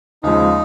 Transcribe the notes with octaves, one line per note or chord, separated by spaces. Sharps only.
D#2 C#3 F3 G#3 D#4